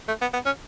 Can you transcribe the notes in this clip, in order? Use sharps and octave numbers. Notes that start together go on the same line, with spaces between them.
A3
B3
B3
C#4